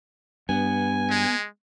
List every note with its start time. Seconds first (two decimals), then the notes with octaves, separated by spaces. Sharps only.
0.49 G2 B3 G#5
1.10 G#3